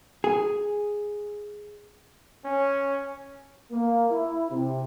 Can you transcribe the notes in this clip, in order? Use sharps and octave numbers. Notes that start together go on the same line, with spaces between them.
G#4
C#4
A#3
E4
C3